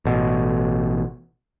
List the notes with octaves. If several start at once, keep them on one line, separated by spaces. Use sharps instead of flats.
A1 B2